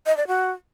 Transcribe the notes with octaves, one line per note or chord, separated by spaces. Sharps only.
D#5
D5
F#4